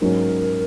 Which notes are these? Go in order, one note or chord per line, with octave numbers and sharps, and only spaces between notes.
G#2 F#3 C#4 A#4